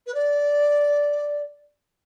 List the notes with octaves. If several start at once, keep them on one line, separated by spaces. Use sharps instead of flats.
B4
D5